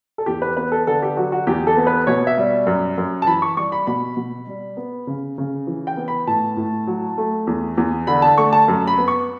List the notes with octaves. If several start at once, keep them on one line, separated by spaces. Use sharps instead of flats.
A4
E2 G4
B4
B3 B4
A4
D3 A4
G4
F#3 F#4
F#4
E2 G4
A4
B3
B4
B2 C#5
E5
G3
F#2
F#2
A5
E3 B5
C#6
G3 C#6
B5
B2 B5
B2
G3
B3
C#3
C#3
E3
G5
B3
B5
A2 A5
A2
F#3
A3
E2
E2
D3 B5
A5
A3 C#6
A5
F#2
B5
B3
C#6